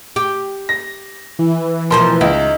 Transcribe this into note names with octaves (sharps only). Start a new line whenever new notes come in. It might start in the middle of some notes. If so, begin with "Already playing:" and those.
G4
A#6
E3
B2 F3 A#4 C5 C6
C#2 D#4 E4